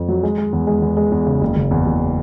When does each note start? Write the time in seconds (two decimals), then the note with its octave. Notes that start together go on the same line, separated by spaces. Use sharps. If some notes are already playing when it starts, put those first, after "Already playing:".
Already playing: F2
0.08 F#3
0.23 G#3
0.38 G#3
0.53 E2
0.67 G#3
0.82 E2
0.97 G#3
1.12 E2
1.27 C#3
1.41 F#1
1.56 F#1
1.71 E2
1.86 F#1